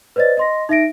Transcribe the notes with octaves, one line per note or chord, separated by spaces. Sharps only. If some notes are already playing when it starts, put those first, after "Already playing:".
B4 C5 D5 D#5 A6
D#5 C6 A#6
D#4 E5 A#6 D7